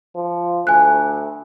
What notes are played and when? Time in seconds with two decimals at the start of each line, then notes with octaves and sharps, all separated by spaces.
0.16 F3
0.67 D2 G#5 F#6